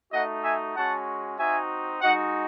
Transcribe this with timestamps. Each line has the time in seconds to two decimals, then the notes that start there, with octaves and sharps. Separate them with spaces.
0.11 A3 D#4 F#4 D#5 F#5
0.43 E5 G#5
0.74 G#3 C#4 F#4 F#5 A5
1.37 C4 D#4 F#4 E5 G#5
2.01 G#3 D#4 F#4 D#5 F#5